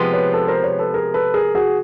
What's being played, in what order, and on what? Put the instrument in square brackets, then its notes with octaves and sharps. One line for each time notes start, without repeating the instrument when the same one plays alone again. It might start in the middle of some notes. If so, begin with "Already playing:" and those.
Already playing: [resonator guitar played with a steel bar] C3 F3 G#3 B3
[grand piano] B4 C#5
A4 B4
A#4 C5
B4 C#5
A4 B4
G#4 A#4
A4 B4
G#4 A#4
F#4 G#4